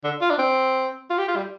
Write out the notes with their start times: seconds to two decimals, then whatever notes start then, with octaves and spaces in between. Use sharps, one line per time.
0.04 D3
0.21 F4
0.30 D4
0.38 C4
1.10 F4
1.18 G4
1.28 F4
1.36 G3